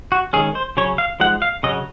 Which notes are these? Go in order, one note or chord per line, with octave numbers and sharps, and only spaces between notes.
F#4
D#3 G#3 C#4 G#4
C5
C#3 F#3 C#4 C#5
F5
F3 G#3 D#4 F#5
F5
C#3 F#3 C#4 D#5